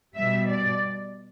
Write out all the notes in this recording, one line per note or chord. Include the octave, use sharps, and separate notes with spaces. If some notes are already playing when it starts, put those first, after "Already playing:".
B2 G3 E5
D5